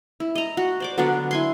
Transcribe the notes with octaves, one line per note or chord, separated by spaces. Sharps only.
E4
D#5 A#5
F#4
C5 D5 D6
D3 F#3 B3 D4
E4 G#5 C6